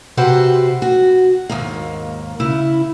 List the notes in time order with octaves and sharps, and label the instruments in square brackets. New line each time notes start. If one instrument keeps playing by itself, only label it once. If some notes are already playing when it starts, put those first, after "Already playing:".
[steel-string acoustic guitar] C3 F#4 G4 B4 C5 F#5
F#4
D#2 G#2 A#3
C#3 E4